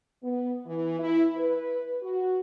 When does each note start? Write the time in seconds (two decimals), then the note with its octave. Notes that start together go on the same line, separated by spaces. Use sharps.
0.22 B3
0.65 E3
0.99 E4
1.37 B4
2.02 F#4